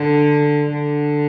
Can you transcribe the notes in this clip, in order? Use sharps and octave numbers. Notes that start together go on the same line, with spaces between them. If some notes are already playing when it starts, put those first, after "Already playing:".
Already playing: D3
D3